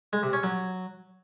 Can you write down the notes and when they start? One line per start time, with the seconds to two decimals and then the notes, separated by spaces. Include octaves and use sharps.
0.13 G#3
0.23 C3
0.33 C#4
0.43 F#3